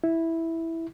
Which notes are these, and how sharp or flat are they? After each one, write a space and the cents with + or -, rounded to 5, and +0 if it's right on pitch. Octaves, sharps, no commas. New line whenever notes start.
E4 -5